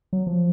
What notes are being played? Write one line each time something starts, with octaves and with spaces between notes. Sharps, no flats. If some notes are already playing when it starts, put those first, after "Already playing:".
F#3
F3